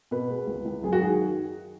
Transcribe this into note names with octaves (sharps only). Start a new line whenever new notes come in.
B2 B4
G#3
C#2
C#2
F#2 G#4
F#4
D#3 G#4